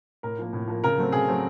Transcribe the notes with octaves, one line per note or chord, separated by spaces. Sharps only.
A2 A#4
F3 A#3
A2
F3 A#3
C#3 A#4
F#3 A3 C4
C#3 G#4
F#3 A3 C4